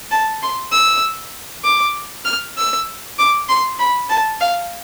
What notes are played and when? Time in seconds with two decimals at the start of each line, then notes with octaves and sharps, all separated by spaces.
0.11 A5
0.42 C6
0.72 E6
1.64 D6
2.25 F6
2.57 E6
3.19 D6
3.48 C6
3.79 B5
4.09 A5
4.40 F5